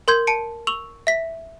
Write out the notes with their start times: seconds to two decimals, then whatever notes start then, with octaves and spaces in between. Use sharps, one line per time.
0.08 A#4 C6 G6 G#6
0.27 A5 C#7 D7
0.67 C#6 E6 F7 F#7
1.07 E5 B6